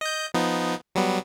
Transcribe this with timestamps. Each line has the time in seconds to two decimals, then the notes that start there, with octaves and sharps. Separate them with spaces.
0.01 D#5 G6
0.34 F3 B3 D#4
0.95 F#3 G3 B3